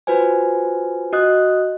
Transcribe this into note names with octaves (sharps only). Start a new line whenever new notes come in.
F4 F#4 B4 C5 G#5
F#4 D#5 D#6 F#6